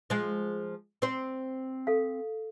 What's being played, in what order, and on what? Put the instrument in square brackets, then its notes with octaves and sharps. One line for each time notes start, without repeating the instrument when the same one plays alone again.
[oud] F3 G#3
C4 C5
[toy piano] A4 F5